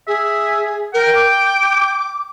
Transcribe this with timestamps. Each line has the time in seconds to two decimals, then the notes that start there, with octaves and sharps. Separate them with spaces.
0.07 G#4 E5
0.94 A#4 G5
1.15 D6